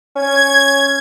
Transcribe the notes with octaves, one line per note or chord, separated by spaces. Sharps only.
C#4 G#6